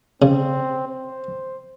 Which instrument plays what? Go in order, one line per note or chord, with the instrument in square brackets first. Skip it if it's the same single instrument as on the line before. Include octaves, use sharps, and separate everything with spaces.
[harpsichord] C#3 [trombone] C4
[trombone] C5